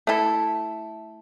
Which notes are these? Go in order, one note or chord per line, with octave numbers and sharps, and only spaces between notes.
A3 E4 A4